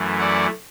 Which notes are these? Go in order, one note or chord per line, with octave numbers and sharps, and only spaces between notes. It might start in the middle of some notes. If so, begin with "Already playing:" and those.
Already playing: F#2 E3 A3
D5 F#5